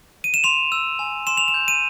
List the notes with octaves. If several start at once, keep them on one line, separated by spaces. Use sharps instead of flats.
D#7
E7
C6 F7
E6
G#5
C6 E7
F7
E7
G6
D#7